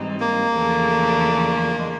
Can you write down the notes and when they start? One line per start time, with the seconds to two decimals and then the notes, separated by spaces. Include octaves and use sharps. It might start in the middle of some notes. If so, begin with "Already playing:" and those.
Already playing: G#2 E3 G3 C4 D#4
0.20 A#3
0.54 E2 C#3 F3 A3 D4
1.79 G#3